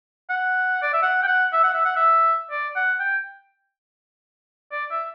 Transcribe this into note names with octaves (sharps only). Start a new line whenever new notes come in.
F#5
D5
E5
F#5
G5
F#5
E5
F#5
E5
F#5
E5
D5
F#5
G5
D5
E5